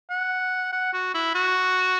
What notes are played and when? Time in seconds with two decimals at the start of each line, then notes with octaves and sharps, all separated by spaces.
0.10 F#5
0.73 F#5
0.94 F#4
1.15 E4
1.35 F#4